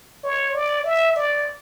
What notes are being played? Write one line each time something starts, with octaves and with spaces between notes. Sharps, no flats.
C#5
D5
E5
D5